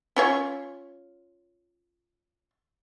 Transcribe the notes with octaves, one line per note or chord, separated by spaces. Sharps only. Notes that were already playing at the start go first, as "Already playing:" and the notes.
C#4 F4 C#5